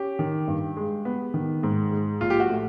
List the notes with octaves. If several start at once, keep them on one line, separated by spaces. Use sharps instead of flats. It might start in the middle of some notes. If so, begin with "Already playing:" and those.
Already playing: C#4 G4
D#3
G2
G#3
B3
D#3
G#2
G#3
A#1 F4
G4
F#4
A2